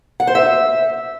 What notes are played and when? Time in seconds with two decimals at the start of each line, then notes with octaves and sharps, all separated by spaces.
0.20 F#5
0.27 C5
0.35 E5